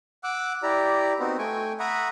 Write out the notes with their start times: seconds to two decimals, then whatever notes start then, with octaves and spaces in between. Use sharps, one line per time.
0.24 F#5 D6 E6 F#6
0.63 E4 G4 D5 A#5
1.19 B3 C4 D#4 F#4
1.39 A3 G5 G#5 C#6
1.79 E5 F#5 A#5 B5 C#6 D#6